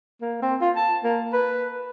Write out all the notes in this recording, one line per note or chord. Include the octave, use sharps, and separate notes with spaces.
A#3
C4
F4
A5
A#3
B4